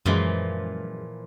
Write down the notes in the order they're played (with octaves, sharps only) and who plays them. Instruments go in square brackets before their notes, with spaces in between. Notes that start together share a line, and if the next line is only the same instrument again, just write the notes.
[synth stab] F#2 G#3 [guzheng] A#2 E3 F3